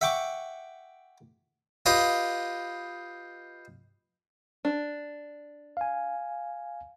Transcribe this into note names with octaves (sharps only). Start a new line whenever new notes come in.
E5 F#5 G5 C#6 D6
F4 G4 B4 D#5
D4
F5 G#5